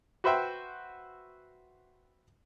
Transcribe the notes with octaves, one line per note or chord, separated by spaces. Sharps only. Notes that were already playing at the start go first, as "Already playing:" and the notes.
F#4 B4 C5 E5 G5